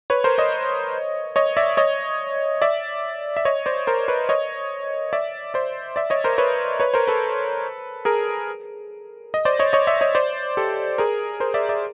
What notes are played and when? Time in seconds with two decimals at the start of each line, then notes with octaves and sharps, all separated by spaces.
0.10 B4 C#5
0.24 A#4 C5
0.38 C#5 D#5
1.36 C#5 D#5
1.57 D5 E5
1.77 C#5 D#5
2.62 D5 E5
3.37 E5
3.45 C#5 D#5
3.66 C5 D5
3.87 A#4 C5
4.08 B4 C#5
4.29 C#5 D#5
5.13 D5 E5
5.54 C5 D5
5.96 D5 E5
6.10 C#5 D#5
6.24 A#4 C5
6.38 B4 C#5
6.80 B4 C#5
6.94 A#4 C5
7.07 A4 B4
8.05 G#4 A#4
9.34 D#5
9.45 C5 D5
9.59 C#5 D#5
9.73 C#5 D#5
9.87 D5 E5
10.01 C#5 D#5
10.15 C5 D5
10.57 G4 A4
10.98 G#4 A#4
11.40 A#4 C5
11.54 D5 E5
11.69 D5 E5